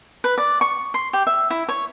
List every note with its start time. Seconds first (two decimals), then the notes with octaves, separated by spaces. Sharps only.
0.24 B4
0.38 D5
0.61 C#6
0.94 C6
1.13 G4
1.27 E5
1.50 E4
1.69 C#5